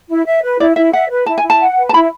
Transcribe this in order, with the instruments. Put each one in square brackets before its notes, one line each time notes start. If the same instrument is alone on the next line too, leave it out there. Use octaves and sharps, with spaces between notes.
[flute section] E4
E5
B4
[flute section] E4 [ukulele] D5
[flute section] E4 [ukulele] E5
[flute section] E5 [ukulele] F#5
[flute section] B4
[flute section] E4 [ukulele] A5
[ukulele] G#5
[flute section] E4
[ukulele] A5
[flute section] F#5
B4
[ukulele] A5
[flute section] E4 [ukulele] B5